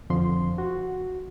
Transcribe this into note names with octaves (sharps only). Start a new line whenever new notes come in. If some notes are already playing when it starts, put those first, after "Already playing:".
F2 D3 F3 C6
F#4